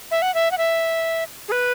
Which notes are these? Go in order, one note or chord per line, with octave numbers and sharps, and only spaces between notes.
E5
F#5
E5
F#5
E5
G#4
B4